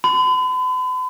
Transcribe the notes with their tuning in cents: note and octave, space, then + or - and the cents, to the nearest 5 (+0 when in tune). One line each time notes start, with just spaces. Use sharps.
B5 +45